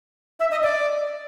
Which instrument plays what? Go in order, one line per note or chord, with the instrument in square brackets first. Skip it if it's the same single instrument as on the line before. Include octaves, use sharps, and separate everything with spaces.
[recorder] E5
D#5
D5